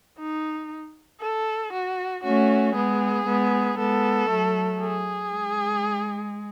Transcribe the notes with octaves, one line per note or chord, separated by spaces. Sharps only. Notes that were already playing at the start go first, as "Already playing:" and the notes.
D#4
A4
F#4
A3 C#4 F#4
G#3 B3 G#4
G#3 B3
G#3 B3 A4
F#3 A3
G#4
G#3